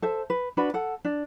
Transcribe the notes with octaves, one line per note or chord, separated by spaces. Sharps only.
A4 C5 E5
B4
D4 F#4 B4 B5
A4 F#5
D4